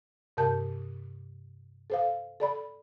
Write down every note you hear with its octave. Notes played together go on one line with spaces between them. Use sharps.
G2 C3 A#4 A5 G6
A4 C5 F5
A4 D5 B5